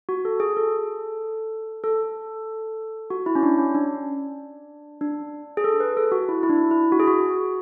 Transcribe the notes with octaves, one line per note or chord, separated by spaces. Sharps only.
F#4
A4
G#4
A4
A4
F#4
E4
C#4
D4
C#4
D4
D4
G#4
A4
B4
A4
F#4
E4
E4
D4
E4
F#4
G#4
F#4